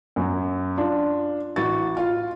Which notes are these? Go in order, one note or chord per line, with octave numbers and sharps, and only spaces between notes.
F#2 F#3
D4 F4
A1 F#4 C#6 A6
F4 F5